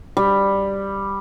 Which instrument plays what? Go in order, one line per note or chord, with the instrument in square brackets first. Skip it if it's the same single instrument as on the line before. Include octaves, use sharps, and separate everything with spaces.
[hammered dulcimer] G3